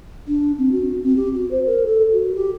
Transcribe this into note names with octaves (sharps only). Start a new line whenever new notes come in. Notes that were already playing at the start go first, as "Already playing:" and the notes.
D4
C4
F#4
C4
G4
F#4
C5
A#4
A4
F#4
G4